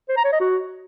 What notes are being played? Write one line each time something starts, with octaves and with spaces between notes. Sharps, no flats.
C5
A#5
C#5
D#5
F#4